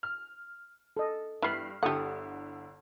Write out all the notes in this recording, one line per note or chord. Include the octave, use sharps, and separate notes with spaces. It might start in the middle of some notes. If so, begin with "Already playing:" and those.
F6
A4 D#5
G2 E3 B3 B5 F6 C7
G1 D3 E4 G4 A4 F#5 C#6 D#6